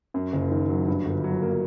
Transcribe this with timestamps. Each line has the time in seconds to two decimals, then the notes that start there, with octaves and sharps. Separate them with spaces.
0.14 F#2
0.33 F#1
0.51 D#3
0.69 F#3
0.88 G2
1.06 G1
1.24 F#3
1.42 A#3